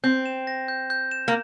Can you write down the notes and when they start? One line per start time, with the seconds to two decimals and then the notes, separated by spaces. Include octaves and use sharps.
0.04 C4 G6
0.26 E7
0.47 A#6
0.68 G6
0.90 G6
1.11 E7
1.28 A#3